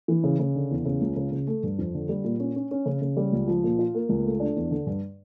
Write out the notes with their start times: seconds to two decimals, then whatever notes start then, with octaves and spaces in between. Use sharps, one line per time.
0.08 E3
0.24 C#3
0.40 C#3
0.55 D3
0.71 E2
0.85 C#3
1.01 C#2
1.16 C#3
1.32 C#3
1.47 A3
1.63 G2
1.79 F2
1.94 D3
2.09 G3
2.24 A#2
2.40 C#4
2.56 C#4
2.71 C#4
2.86 C#3
3.02 C#3
3.17 G3
3.32 C#2
3.47 F3
3.64 A#2
3.79 F4
3.95 A#3
4.09 C#2
4.24 A3
4.40 D4
4.56 E2
4.71 D3
4.87 G2